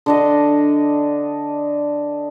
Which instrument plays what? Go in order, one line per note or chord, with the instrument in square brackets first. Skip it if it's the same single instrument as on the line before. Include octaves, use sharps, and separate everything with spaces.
[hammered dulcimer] D3 D4 D#5